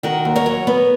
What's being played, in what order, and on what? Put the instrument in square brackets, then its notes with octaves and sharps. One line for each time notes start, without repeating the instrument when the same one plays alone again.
[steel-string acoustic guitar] D#3 F#4 A#4
D#2
A#4 C#5
F#3
B3